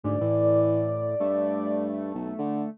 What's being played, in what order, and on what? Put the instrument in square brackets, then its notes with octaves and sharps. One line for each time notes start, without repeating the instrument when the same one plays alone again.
[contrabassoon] D2 [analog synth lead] G#2 [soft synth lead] D5
[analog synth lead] A2 [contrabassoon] E3
[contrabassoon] G2 [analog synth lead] A3
[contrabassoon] B1
D3